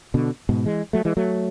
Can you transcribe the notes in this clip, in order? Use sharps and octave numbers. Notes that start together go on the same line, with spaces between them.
B2 D3
G#2 B2
E3 G#3
F#3 A3
E3 G#3
F#3 A3